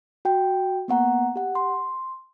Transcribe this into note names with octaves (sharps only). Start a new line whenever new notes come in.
F#4 G5
A#3 B3 F#5 A#5
G4 F#5
C6